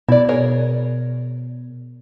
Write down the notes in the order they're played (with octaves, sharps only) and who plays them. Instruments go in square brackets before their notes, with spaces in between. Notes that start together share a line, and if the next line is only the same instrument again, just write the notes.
[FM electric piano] B2 [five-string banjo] E4 D5
[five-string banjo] G#4 A#4 C#5